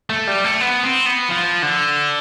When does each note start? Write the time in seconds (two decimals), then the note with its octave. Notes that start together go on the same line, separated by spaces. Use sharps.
0.10 A3
0.27 G3
0.44 A3
0.61 B3
0.83 C4
1.06 B3
1.29 F3
1.62 D3